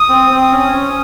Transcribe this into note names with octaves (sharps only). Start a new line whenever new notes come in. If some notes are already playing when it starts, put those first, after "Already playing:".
Already playing: D#6
C4
C4
C#4
C#4